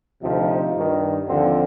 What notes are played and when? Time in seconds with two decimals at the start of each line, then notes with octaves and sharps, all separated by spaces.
0.21 D2 C3 F3 D#4
0.75 G2 D#3
1.27 D#2 D3 F3 C4